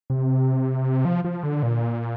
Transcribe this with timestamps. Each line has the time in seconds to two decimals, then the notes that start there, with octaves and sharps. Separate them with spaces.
0.10 C3
1.05 F3
1.25 F3
1.43 D3
1.63 A#2